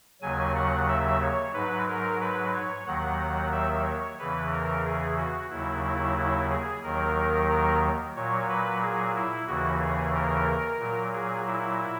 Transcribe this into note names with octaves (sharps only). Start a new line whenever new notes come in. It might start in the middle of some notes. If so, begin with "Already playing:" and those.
D#2 C#3 F#3 G#5
F#5
E5
C#5
G#2 F#3 B4
A#4
B4
C#5
D#2 D#3 F#3 F#5
F#5
E5
C#5
E2 C#3 E3 B4
A#4
G#4
F#4
D#2 C#3 F#3 E4
E4
E4
G#4
D#2 D#3 F#3 A#4
A#4
A#2 F#3 C#5
B4
G#4
E4
D#2 C#3 E3 F#4
G#4
A#4
A#2 F#3
G#4
E4